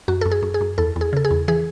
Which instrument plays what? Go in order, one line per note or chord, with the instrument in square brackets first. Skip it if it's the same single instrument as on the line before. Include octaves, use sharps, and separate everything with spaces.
[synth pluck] F#2 F#4
F#2 A4
G#4
F#2
G#4
F#2
E2 A4
E2
G#4
C#3 A4
G#4
E2
E3 G#4